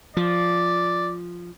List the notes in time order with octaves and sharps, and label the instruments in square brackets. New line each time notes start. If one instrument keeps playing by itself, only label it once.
[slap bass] F3 [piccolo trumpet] D5